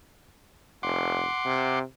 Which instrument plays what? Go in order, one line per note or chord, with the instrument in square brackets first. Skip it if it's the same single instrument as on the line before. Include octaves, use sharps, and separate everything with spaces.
[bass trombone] F1 [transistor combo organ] F#5 C6 D6
[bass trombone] C3